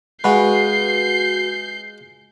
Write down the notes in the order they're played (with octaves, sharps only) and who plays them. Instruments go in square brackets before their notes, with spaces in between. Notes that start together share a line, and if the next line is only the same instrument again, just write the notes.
[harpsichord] G#3 F4 [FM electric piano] F#4 B4 [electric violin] G6 C7